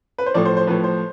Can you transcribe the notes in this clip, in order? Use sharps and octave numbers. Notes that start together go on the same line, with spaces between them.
B4
C5
A2 F3 D5
C5
C5
A2 F3 B4
C5